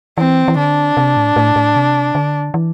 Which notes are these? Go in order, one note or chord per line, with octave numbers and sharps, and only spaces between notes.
E3 C4
E3
D3 D4
C3
A2
A2
A2
C3
D3
E3